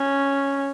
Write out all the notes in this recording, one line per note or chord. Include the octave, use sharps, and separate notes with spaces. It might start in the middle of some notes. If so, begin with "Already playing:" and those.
Already playing: C#4